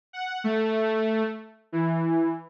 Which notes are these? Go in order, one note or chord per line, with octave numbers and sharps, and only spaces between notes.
F#5
A3
E3